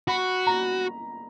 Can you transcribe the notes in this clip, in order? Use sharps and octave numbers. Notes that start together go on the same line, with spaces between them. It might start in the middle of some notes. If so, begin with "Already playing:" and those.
F#4 B5
A#5